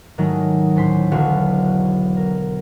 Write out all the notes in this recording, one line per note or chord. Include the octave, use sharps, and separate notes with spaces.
G#2 D#3 F#3 G#3 A3 D#4
D2 A2 C#4 C5 C6 B6
E1 B1 D3 F#3 F#4 F5
A#4